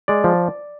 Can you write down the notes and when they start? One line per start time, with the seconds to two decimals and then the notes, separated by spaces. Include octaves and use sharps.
0.08 G#3 D5
0.24 F3